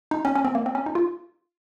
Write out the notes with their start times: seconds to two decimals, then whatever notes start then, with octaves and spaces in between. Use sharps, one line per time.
0.11 D#4
0.25 C#4
0.35 C#4
0.45 C4
0.55 A#3
0.66 C4
0.75 C#4
0.86 D#4
0.95 F4